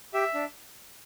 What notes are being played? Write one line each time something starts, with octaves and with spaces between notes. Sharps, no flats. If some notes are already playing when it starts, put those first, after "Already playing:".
G4 E5
D4